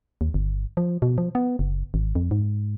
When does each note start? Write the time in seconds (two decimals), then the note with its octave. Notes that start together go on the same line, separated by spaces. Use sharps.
0.21 D#2
0.34 G1
0.77 F3
1.02 B2
1.18 F3
1.35 B3
1.59 F#1
1.94 G#1
2.15 F2
2.31 G#2